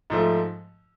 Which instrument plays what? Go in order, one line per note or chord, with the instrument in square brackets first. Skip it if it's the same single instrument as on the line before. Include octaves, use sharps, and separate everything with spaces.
[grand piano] G#2 F3 A3